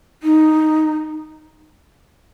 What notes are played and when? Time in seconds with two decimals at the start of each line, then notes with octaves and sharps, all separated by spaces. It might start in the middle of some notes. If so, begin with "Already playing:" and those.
0.23 D#4